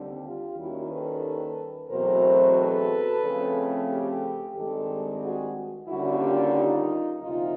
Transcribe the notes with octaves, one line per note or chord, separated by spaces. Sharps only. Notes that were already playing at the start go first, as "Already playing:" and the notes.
Already playing: D#2 D3 G3 C4
F4 G4
D#2 D#3 G3 A#3 C#4 E4 F#4
A4 B4
E2 B2 F#3 A3 C4 A#4 C5
A4 B4
C#3 F3 A3 C4
G4 A4
G2 D#3 G#3 C4 G4 A4
F#4 G#4
D#2 D3 G3 A#3 C#4 E4 F#4
F4 G4
D#4 F4
D2 C3 F3 A#3 D#4 F4